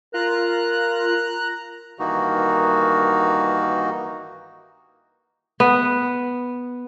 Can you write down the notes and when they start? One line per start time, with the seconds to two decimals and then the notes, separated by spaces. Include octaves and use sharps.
0.14 F4 A#4 A#5 F#6
1.99 G2 D#3 E3 A#3 D#4 F#4
5.60 B3